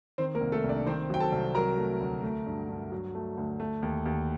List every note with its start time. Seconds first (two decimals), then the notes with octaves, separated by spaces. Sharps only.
0.18 D#3 C4 C5
0.35 A#3 A#4
0.41 C2
0.52 A3 A4
0.64 C2
0.69 D4 D5
0.87 D#3 C4 C5
1.10 F#3 G5
1.20 A4 A5
1.32 C2
1.55 F#3 A#4 A#5
1.77 A3
2.01 D2
2.23 A3
2.46 G2
2.69 G2
2.92 F#3
3.15 A3
3.37 D2
3.60 A3
3.82 D#2
4.05 D#2